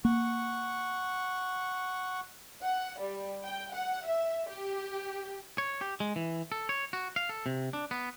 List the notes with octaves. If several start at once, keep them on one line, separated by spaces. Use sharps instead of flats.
A#3 F#5 C#6
F#5
G3
G5
F#5
E5
G4
C#5
G4
G#3
E3
A4
C#5
F#4
F5
A4
C3
D4
B3